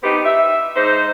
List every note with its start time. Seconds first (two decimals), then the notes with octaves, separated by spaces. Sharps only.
0.03 B3 C4 D#4 G4
0.25 E5
0.76 G#2 D#4 C5